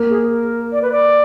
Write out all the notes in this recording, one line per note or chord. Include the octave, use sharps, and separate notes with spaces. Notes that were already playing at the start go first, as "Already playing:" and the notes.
Already playing: A#3
G#4
A#4
D5
B4
D5